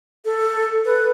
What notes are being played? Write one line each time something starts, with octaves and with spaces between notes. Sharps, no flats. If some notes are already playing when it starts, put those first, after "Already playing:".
A4
B4